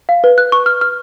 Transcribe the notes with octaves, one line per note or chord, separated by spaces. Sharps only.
F5
B4
F#6
C#6
F6
F6